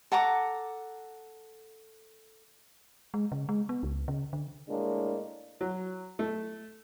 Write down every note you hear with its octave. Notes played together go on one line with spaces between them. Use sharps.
A4 F#5 A#5 D6
G#3
C#3
G#3
B3
C#2
C#3
D3
A2 G#3 A#3 D4
F#3
A3